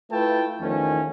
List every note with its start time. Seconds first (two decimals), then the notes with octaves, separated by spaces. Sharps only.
0.11 A3 E4 F4 B4 G5 A5
0.61 E2 D#3 F3 A3 C#4